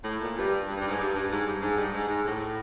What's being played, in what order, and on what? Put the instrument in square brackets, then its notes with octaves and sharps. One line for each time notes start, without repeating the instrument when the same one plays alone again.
[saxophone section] A2
A#2
G2
G2
G2
G#2
G2
G2
G#2
G2
G#2
G2
G#2
G#2
A2